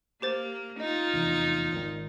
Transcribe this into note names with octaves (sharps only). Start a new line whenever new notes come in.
A#3 G4 C5 A6
D#4 F4 D#5
F1 E2
G#1 D#3